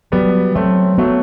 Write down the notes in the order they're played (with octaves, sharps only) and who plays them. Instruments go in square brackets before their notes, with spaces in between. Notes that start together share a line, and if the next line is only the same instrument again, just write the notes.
[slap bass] F#3 [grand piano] G3 B3
[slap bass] F#3 [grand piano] A3 C4
[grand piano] F#3 A3 [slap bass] B3